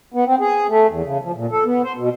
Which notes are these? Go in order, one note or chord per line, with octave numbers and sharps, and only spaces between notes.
B3
C4
G#4
A3
E2
C#3
F3
A#2
A4
B3
C5
B2